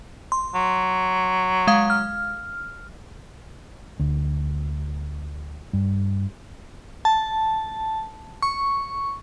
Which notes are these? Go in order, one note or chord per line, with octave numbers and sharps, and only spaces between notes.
C6
F#3
G#3 F5
F6
D2
G2
A5
C#6